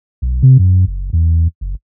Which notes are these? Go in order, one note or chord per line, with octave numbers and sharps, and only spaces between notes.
B1
C3
F#2
F#1
E2
F#1